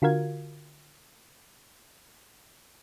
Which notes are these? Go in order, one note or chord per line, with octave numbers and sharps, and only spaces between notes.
D3 F4 F#4 A#4 F5 G#6